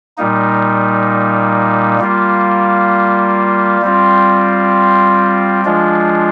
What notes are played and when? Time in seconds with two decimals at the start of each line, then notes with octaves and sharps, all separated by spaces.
0.17 A#2 G3 A#3 D#4
2.00 G3 A#3 F4
3.82 G3 C4 F4
5.65 F3 G#3 D4 F4